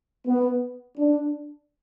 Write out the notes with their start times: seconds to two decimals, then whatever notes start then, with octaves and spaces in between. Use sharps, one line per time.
0.27 B3
0.98 D4